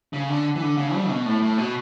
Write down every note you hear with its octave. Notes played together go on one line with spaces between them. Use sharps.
C#3
D3
E3
D3
C#3
G3
B2
A2
A2
B2